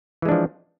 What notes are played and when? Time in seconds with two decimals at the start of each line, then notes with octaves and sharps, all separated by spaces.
0.22 E3
0.25 G#3
0.29 D4
0.32 F3